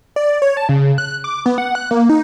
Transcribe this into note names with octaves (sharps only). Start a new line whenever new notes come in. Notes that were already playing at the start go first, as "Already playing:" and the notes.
D5
C#5
A5
C#3
F#6
D6
B3
F#5
F#6
A#3
D#4